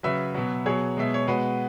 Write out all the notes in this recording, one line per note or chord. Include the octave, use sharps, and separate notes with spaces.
C#3 F#3 B4 E5
B2 F#3
B2 F#3 G#4 C#5
B2 G#3 E5
C#5
B2 G#3 F#4 B4